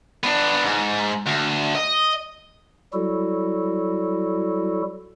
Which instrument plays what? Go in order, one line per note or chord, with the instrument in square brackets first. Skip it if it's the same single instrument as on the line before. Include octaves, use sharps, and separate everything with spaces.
[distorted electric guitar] B3 D4
G#2
D2
D#5
[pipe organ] F#3 G3 E4 F#4 A4